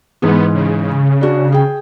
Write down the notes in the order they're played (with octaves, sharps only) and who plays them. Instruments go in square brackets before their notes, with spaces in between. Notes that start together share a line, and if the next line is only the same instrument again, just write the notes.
[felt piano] G#2 E3 G#4 [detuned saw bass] B3
[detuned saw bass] C#3
[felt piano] D4 F#4
G#4 G5